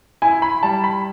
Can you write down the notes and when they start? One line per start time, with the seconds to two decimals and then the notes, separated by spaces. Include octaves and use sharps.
0.22 E4 G#5
0.42 B5
0.63 G3 A5
0.84 B5